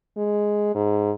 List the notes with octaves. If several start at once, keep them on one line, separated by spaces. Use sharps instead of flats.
G#3
G#2